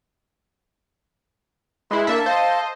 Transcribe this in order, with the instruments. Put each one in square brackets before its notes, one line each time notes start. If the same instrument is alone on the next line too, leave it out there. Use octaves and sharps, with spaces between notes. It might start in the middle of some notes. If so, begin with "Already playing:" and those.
[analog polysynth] G#3 E4 [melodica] B4 C6
[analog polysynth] A#3 D4 E5 [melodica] A4 A5
[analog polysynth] C5 D#5 [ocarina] F5